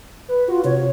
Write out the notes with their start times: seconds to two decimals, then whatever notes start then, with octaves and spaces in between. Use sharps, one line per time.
0.28 B4
0.48 F4 F#4
0.65 C3 C#5